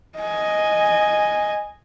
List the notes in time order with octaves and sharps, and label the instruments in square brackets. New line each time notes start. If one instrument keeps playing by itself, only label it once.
[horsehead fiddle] D#5 G#5